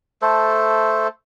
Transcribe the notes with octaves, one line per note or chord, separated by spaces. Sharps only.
A3 A4 C5